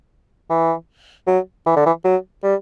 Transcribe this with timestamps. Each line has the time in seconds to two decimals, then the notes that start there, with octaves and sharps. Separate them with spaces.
0.50 E3
1.27 F#3
1.66 E3
1.76 D3
1.86 E3
2.04 F#3
2.43 G3